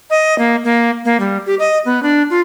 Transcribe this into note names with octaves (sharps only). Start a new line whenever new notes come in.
D#5
A#3
A#3
A#3
G3
G4
D#5
B3
D4
F4